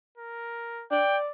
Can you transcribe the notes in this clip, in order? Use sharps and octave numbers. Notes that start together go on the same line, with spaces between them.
A#4
D5 G5